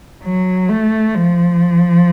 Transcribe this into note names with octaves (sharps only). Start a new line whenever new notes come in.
F#3
A3
F3